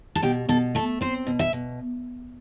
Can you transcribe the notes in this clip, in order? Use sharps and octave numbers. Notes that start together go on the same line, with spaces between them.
A4
B2 G4
B2 A4
A3 A4
C4 C5
B2
E5
B2